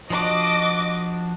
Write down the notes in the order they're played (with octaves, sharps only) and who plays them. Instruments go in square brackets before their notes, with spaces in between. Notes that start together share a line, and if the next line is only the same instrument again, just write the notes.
[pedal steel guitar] F3 D4 F#4 [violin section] D#5 D6